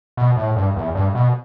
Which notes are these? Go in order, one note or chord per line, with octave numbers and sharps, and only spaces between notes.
B2
A2
G2
E2
G2
B2